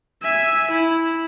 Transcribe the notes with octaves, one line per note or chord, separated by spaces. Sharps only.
E5 G#5
E4